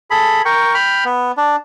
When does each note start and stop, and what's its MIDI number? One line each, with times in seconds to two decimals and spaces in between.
0.11 0.42 68
0.11 0.42 69
0.11 0.42 83
0.45 0.74 70
0.45 0.74 79
0.45 0.74 85
0.74 1.04 79
0.74 1.04 83
0.74 1.04 89
1.05 1.32 59
1.37 1.56 62